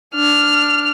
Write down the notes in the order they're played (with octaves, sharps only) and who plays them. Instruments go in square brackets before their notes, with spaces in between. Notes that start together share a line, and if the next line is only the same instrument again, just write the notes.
[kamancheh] D4 F6